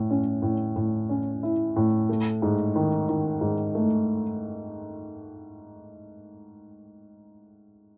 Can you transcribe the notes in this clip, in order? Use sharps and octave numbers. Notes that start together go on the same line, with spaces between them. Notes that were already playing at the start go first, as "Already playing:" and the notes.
Already playing: A2
C#4
A2
A2
C#4
E4
A2
A3
G#2
D#3
D#3
G#2
A3